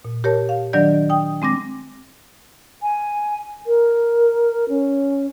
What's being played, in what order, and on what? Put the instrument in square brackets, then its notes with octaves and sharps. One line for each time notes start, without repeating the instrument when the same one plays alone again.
[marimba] A#2
G4 A#4 C#5 A5
F5
D#3 F#3 D4 D5 G6
G5 D#6
G#3 C4 D6 A#6
[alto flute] G#5
A#4
C#4